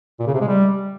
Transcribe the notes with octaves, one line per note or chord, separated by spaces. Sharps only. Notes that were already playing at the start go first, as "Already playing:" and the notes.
A#2
C#3
C3
G#3
G3